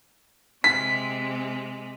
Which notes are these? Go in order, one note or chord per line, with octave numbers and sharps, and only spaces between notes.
C3 G#3 B6